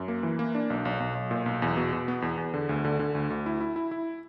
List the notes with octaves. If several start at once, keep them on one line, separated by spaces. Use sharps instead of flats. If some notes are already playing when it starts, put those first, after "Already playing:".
Already playing: F#2
A#3
E3
A#3
D4
B1
B1
B1
B1
A#2
B1
E2
B2
B2
B3
E2
E2
D3
D2
D3
D3
D2
D2
E4
E4
E4
E4